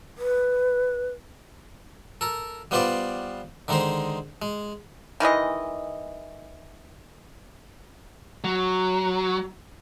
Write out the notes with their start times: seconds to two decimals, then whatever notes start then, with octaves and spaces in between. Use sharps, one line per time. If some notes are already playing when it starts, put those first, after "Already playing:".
0.18 B4
2.21 A4 A#4
2.71 G3 B3 F4 B4 C5 D5
3.68 D3 D#3 G#3 D#4 C5
4.42 G#3
5.20 D#3 E3 G#3 D#5
8.44 F#3